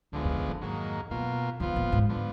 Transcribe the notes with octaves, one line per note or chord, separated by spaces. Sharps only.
D2 G#2 D3 F3 G#3 B3
F#2
F#2
F2
G#2 D#3 F#3 A#3
F#2 B2 A#3 F4
F2 D3 F3 B3 F4
A#2
G#2
D3 F3 B3